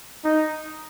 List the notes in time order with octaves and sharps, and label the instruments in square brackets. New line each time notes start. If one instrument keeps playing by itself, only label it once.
[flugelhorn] D#4